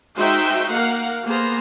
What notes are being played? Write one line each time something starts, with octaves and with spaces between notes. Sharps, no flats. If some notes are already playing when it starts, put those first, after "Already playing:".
G#3 D#4 F#4 C5 E5 G5
A#3 A#4 F5 F#5
A#3 B3 G#4 C5 A#5